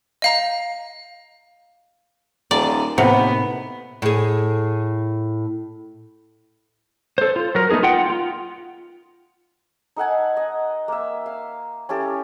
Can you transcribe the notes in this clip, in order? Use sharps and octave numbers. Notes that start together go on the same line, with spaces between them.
D#5 F5 A#5
D#1 D5
D#2 A2 C3 B3 F#5
A2 G#4
A4 C5
F4
F#3 A#4
A3 B3 D#4 G#4 A#4
F4 F#5 G5
F4
D#4 A4 F#5 G#5
D#5
A#3 E5
F5
C#4 E4 G4 A4